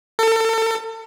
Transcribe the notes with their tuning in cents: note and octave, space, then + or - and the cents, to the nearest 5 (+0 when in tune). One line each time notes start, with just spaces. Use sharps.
A4 +35